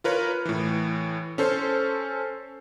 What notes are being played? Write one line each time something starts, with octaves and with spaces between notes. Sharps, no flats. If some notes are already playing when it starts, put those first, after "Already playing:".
F4 A#4 B4 C#5
A2 E3
C#4 A4 C5